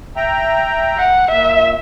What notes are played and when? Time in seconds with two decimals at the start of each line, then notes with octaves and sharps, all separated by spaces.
0.16 E5 G5 A#5
0.97 F#5
1.30 A#2 E5